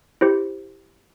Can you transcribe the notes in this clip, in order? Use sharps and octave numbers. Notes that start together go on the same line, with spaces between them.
E4 G4 C5